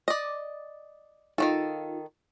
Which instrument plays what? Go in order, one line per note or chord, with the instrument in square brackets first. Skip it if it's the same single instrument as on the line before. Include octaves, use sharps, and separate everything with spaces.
[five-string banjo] D5 D#5
[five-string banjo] D#3 F#3 A4 [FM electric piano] D#4 F4